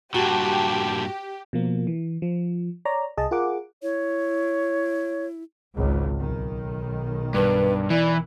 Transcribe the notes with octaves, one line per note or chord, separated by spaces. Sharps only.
G2 A#2 F#4 G4 A5
B2 F3 A#3
E3
F3
C#5 D5 A#5
C2 G#4 D#5 A5
F4 G#4 A#4 F#5 D6
E4 C#5
G#1 C#2 G#2
B1 D#3
G2 B4
E3 D5